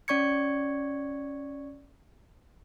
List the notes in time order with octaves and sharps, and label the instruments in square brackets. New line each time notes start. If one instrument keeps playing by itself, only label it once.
[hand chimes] C#4 D5 C#6 G#6 C#7